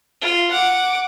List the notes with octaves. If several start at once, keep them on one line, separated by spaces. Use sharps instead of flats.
F4
F#5 D6